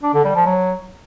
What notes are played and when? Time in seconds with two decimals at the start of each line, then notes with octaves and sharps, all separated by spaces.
0.03 D4
0.14 D3
0.24 G3
0.35 F3
0.46 F#3